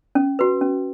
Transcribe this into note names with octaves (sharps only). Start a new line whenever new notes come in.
C#4
F#4 B4
C#4